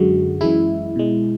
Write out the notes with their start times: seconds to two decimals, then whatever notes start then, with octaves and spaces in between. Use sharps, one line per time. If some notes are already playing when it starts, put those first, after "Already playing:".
Already playing: F#2 D3 G#3 F#4
0.41 F#2 E3 G#3 E4
0.96 B2 G#3